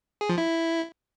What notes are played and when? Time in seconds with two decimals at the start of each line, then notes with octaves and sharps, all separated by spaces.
0.21 G#4
0.29 F3
0.38 E4